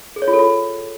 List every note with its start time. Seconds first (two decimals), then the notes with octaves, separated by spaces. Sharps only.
0.16 G#4
0.22 C#5
0.28 F4
0.33 A4
0.39 F4